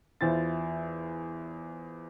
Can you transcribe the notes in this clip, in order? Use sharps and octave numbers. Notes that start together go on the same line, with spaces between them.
E2 E4 F4 C5 A6